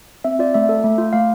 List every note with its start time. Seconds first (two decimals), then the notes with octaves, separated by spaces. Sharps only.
0.24 C4 E5
0.39 F4 D5
0.54 A3 E5
0.69 A4
0.84 A3
0.98 F4
1.13 A3 F5